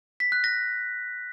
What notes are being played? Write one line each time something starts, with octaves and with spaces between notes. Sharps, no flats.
B6
F#6
A#6